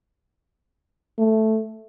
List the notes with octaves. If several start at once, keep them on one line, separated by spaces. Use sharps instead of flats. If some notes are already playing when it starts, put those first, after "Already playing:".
A3